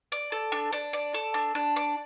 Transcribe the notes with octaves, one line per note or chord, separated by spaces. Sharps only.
D5
A4
D4
D4
D5
A4
D4
D4
D5